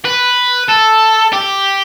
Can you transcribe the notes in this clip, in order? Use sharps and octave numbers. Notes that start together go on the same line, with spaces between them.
B4
A4
G4